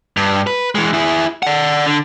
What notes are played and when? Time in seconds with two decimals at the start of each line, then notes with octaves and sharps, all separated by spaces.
0.17 G2
0.47 B4
0.75 E3 G#3
0.93 E4 G#4
1.43 D5 F#5
1.86 D3